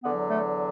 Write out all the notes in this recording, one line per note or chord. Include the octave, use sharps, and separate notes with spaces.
E2 D3 F#3 B3
A3